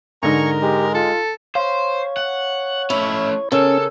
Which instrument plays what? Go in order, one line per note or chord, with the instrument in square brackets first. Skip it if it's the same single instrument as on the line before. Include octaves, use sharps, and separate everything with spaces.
[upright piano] G#2 D3 D#4 [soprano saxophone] A#4 [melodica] G#5 A#5 C#6
[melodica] G#3 [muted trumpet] G4
[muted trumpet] F4 [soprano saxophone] A4
[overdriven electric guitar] C5 [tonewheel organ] C#5 [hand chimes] F5
[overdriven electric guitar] F#5
[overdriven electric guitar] A3 C#4 [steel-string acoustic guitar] E4
[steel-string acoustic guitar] C#3 [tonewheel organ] C#4 [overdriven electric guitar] A4 [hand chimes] A#4 E6